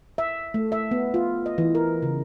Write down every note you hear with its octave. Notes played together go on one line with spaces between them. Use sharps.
E5
A3
E5
B3
F4
D#5
E3
A#4
C#3